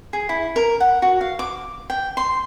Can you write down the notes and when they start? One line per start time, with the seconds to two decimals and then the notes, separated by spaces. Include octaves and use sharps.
0.13 G#4
0.29 E4
0.56 A#4
0.80 F#5
1.02 F#4
1.21 F5
1.39 D6
1.90 G5
2.17 C6